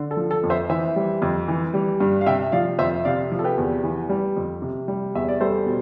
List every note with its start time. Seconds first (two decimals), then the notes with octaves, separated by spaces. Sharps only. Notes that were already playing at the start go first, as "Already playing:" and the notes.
Already playing: D3
0.11 A4
0.17 F3
0.31 A4
0.44 F2
0.50 C5 E5
0.69 E3 C5 E5
0.96 G3
1.22 F2
1.48 E3
1.74 G3
2.00 G2
2.21 F5
2.26 C3 E5 G5
2.52 F3 D5 F5
2.79 F2 C5 E5
3.05 C3 D5 F5
3.32 F3
3.39 A4
3.44 G4 B4
3.57 E2
3.84 E3
4.09 G3
4.36 F2
4.62 C3
4.88 G3
5.15 E2 E5
5.28 D5
5.40 G3 A4 C5
5.66 B2